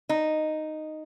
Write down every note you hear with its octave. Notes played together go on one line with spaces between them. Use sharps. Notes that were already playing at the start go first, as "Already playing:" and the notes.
D#4